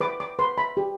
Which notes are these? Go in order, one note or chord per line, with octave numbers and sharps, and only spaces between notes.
B4 D6
D6
B4 C6
B5
G4